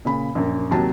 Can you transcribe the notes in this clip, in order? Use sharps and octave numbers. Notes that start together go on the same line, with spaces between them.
A#2 C#3 B5
A#1 F#2
D#2 C3 F#3 A5